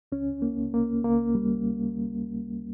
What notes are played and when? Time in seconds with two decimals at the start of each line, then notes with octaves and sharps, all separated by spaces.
0.12 C#2 C#4
0.42 A#3
0.58 C#2
0.74 A#3
1.04 C#2 A#3
1.35 G3